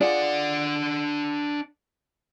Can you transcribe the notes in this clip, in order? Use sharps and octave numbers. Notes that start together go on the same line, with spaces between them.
D4 F4 G#4 D5 F#5